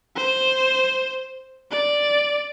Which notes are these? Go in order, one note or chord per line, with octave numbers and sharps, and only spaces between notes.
C5
D5